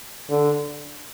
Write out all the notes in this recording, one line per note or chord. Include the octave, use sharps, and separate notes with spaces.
D3